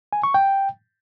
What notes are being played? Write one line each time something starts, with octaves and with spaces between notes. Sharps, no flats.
G#5
C#6
G5